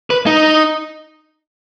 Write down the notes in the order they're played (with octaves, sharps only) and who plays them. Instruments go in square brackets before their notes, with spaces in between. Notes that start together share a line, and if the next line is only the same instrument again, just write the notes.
[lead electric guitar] B4
D#4